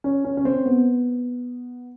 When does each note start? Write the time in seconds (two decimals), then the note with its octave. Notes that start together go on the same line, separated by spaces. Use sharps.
0.04 C#4
0.25 C#4
0.37 C#4
0.45 C4
0.66 B3